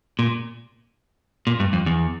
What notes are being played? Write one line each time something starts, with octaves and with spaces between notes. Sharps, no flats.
A#2
A#2
G2
F2
E2